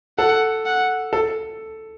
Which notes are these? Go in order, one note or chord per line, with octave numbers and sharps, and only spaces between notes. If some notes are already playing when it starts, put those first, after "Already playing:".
A4 F#5
F#5
A4